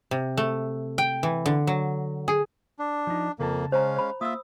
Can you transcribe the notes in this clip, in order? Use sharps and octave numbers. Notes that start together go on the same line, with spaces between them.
C3
A3
G5
E3
D3
F#3
G#4
D4
F3 D#4
F2 C#3 A#3 B4 A5
G#3 C#4 C5 F5 A#5
C5 B5
A#3 F4 E5 D#6 E6